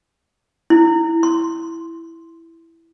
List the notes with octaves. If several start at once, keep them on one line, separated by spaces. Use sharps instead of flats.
E4
C6